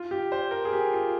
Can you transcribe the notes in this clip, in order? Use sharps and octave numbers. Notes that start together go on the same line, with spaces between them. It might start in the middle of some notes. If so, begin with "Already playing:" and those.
Already playing: F4
G4
C5
A#4
G#4
G4
F4